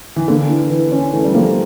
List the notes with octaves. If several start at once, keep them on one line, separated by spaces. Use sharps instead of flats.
E3
D3 A#3
E3
E3
C#4
E3 A3
G3
F3 A3 A#3